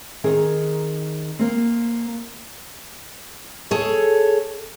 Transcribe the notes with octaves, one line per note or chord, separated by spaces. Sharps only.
D#3 C4 G#4 A#4
A#3 C4
G#4 A4 C#5